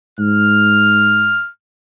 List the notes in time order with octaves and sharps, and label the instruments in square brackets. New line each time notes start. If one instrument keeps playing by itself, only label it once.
[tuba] G#2 [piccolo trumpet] F6